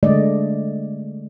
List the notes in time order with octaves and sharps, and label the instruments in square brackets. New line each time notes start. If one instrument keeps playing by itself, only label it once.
[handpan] D3 G#3 A3 D5 D#5